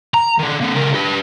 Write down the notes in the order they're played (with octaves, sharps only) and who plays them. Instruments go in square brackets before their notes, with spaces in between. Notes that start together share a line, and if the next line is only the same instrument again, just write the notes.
[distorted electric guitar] A#5
D#3 D4
A#3 C4
C#2 A#4
G4 B4